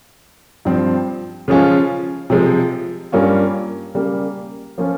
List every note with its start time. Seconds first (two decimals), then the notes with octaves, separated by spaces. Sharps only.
0.65 G2 F3 C4
1.48 C#3 F3 G#3 C#4 F4
2.30 C3 F3 G#3
3.12 G2 G3 A#3 C#4 F4
3.95 C#3 G3 A#3
4.78 F3 A#3 C#4 F4